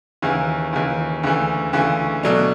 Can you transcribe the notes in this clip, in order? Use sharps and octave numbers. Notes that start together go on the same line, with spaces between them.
D#2 C#3 E3
D#2 C#3 E3
D2 C#3 E3
D2 C#3 E3
B2 F#3 A3 D4